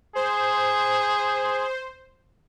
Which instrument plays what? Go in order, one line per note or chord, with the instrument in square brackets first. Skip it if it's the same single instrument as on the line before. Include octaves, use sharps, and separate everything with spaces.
[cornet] G#4 [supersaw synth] C5